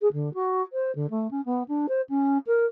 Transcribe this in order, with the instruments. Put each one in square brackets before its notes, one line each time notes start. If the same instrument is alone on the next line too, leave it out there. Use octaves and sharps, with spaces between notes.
[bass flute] G#4
D3
F#4
C5
D3
A3
C#4
B3
D4
C5
C#4
A#4